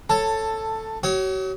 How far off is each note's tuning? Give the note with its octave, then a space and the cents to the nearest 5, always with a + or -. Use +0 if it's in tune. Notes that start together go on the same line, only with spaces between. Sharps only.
A4 +5 C#5 +0 A5 +15
F#4 +45 C#5 +0 D#6 +45